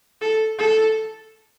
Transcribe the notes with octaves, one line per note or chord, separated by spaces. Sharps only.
A4
A4